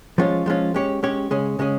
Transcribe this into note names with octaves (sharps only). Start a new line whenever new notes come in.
F3 G#3 C#4 F4
F3 G#3 C#4 F4
G#3 C#4 G4 C#5
G#3 C#4 G4 C#5
C#3 G#3 C#4 G#4
C#3 G#3 C#4 G#4